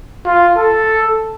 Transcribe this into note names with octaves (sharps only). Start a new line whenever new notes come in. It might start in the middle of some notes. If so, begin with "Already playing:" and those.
F4
A4